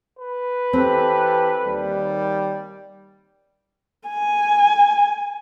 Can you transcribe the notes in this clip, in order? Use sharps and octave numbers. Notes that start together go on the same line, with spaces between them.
B4
E3 C4 G4 A4
D#2 G3
G#5